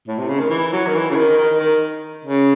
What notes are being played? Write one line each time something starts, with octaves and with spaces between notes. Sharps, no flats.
A2
C3
C#3
D#3
E3
F#3
D#3
E3
C#3
D#3
D#3
D#3
C#3